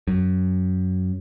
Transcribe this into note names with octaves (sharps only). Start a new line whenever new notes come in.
F#2